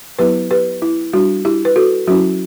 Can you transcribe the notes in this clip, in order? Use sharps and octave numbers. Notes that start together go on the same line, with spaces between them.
F#3 B3 E4 G4 B4
G4 B4
E4
G3 D4 F#4
E4 G4
B4
F#4 A4
F#3 C#4 E4 F#4